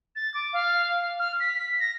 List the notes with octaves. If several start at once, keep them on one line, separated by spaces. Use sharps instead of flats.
A6
D6
F5
F6
B6
A#6